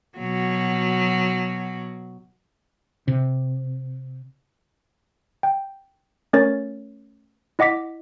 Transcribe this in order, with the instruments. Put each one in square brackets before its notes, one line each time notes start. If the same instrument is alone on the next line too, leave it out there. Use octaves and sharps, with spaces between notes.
[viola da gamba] B2 F#3
[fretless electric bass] C3
[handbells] G5
A3 C#4 A#4 C#5 A6
E4 D#5 F#5 D6 B6